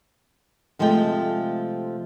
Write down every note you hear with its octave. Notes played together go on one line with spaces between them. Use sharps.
C3 F3 G#3 A3 G5